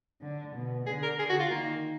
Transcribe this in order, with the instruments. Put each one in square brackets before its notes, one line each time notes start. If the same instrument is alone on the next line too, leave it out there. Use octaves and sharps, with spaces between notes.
[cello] D3
B2
[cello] D3 [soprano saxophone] G#4
[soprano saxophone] A#4
G#4
F#4
F4
[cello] D#3 [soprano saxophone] A#3